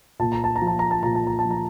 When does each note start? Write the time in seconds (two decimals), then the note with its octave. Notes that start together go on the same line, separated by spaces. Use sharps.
0.20 A#2 A5
0.32 A#5
0.44 A5
0.56 A#5
0.62 F3
0.67 A5
0.79 A#5
0.91 A5
1.03 A#2 A#5
1.15 A5
1.27 A#5
1.39 A5
1.45 F3
1.51 A#5